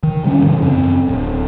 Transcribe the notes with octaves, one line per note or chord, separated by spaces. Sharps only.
D#3
C#3 G3 A3 C#4
D2 G#2 C#3 E3
F#2 C4
D1